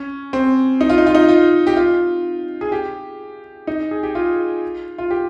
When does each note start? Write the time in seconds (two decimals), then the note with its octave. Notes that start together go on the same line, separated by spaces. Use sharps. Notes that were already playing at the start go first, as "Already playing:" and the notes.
Already playing: C#4
0.33 C4
0.81 D#4
0.90 F4
0.98 D#4
1.07 F4
1.15 D#4
1.29 F4
1.67 G4
1.77 F4
2.61 G#4
2.72 G4
3.67 D#4
3.91 G#4
4.03 G4
4.15 F4
4.98 F4
5.10 G4